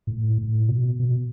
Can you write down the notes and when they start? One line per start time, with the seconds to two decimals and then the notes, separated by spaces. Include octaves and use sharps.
0.07 A2
0.38 A2
0.68 B2
0.99 B2